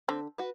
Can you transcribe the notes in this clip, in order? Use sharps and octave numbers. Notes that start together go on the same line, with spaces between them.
D3 C4
F#4 B4